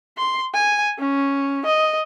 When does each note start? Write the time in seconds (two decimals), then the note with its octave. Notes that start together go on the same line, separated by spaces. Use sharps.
0.17 C6
0.54 G#5
0.99 C#4
1.66 D#5